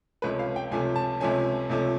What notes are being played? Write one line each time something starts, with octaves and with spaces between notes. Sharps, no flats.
C#2 C3 F3 A3 C#4 B4
F5
G5
C#2 C3 F3 A3 C#4 G#5
A5
C#2 C3 F3 A3 C#4 G#5
C#2 C3 F3 A3 C#4